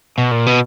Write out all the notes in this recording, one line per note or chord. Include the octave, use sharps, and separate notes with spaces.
B2
A#2
B2